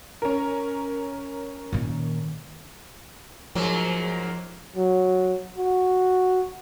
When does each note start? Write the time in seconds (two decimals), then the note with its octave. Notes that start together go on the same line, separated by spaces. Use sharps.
0.22 C#4 A#4
1.73 A#2 D#3
3.55 G#2 F3 F#3 A#3
4.76 F#3
5.58 F#4